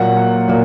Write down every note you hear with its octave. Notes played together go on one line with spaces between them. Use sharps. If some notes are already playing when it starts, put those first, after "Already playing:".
Already playing: A#2 F#3 A#3 F#5
A#2 F#3 A#3